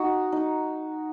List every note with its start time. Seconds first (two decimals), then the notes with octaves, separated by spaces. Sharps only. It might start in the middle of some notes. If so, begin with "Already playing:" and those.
Already playing: D#4 F#4
0.32 D#4